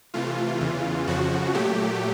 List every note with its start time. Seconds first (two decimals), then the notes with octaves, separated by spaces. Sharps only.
0.14 C3 E3 A3 F4
0.61 E2 C#3 E3
1.07 F2 C#3 F3 F#4
1.54 A#2 F#3 A3 G4